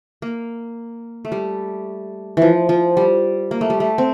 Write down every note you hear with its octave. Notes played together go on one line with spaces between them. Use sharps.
A#3
A3
G3
E3 F3
F3
G3
A#3
A3
G3
A3
C4